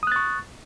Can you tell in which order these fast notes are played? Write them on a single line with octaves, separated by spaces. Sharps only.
D#6 F#6 A6 C#6